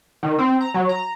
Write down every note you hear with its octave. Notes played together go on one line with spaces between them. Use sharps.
D#3
C4
A#5
F#3
A#5